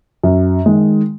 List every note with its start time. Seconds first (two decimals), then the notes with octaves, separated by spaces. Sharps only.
0.23 F#2
0.66 D#3 G#3